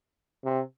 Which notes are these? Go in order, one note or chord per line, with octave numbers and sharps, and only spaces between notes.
C3